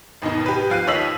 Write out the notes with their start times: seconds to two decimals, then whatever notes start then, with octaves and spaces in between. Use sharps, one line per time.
0.22 G#1 D#2 B2 D#4
0.46 G4 B4
0.70 F3 F5 F#6 D#7
0.87 D#2 C#5 D#5 E6 B6 F#7